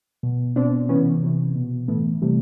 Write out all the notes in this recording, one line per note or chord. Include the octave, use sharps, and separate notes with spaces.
B2
B2 C4 D4
C3 E3 B3 C#4
C3 E3
B2
A2 E3 A3 B3
C3 E3 G3 A3